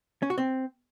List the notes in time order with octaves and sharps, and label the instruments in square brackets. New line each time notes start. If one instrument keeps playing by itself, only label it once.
[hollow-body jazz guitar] C#4
F#4
C4